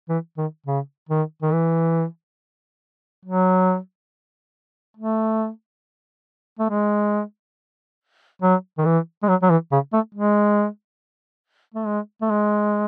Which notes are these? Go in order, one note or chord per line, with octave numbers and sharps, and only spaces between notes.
E3
D#3
C#3
D#3
D#3
E3
F#3
A3
A3
G#3
F#3
D#3
E3
G#3
F#3
F#3
E3
C#3
A3
G#3
A3
G#3
A3
G#3